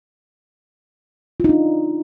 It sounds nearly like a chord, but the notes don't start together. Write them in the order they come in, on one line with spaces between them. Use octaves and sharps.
F4 D#4 D4